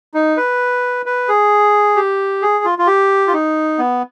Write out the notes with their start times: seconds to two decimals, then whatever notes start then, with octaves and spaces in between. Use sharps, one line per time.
0.14 D#4
0.37 B4
1.06 B4
1.29 G#4
1.96 G4
2.42 G#4
2.65 F4
2.78 F4
2.87 G4
3.27 F4
3.33 D#4
3.78 B3